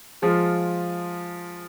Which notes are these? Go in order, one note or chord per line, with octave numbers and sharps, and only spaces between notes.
F3 G#3 F4